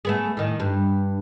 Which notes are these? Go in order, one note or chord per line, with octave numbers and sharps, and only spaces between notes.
A3 B3 G#4
A2 D#3
G2